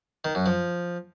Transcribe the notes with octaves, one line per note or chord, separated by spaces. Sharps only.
D#3
F#2
F3